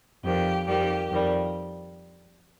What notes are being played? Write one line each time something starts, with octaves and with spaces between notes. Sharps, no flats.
F2 D#3 G3 G4
F2 D#3 G3 G4
F2 D#3 G3